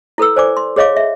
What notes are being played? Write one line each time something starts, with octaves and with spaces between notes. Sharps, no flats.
E4 A4 B4 E6
C5 D5 G#5 D6
C6
G#4 C#5 D#5 F5 D6
E5